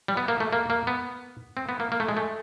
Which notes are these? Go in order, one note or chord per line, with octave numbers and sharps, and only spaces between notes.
G3
B3
A#3
A3
A#3
A#3
B3
C4
B3
A#3
A#3
A3
G#3
A3